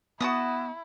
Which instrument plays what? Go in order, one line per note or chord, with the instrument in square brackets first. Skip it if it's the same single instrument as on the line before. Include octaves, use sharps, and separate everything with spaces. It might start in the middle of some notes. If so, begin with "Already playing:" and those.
[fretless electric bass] B3 [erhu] E4 [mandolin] F#4 A5 D#6